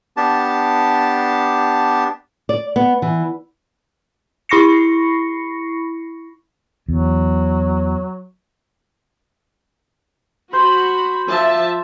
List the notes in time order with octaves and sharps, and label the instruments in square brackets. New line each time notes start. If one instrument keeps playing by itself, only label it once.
[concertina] B3 D4 G4 A5
[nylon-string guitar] D5
B3
E3
[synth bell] E4 B5 C#6 A#6 C7 C#7
[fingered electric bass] E2 [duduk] F#3
[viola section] F#4 B5 [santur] C5
[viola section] F3 E5 A5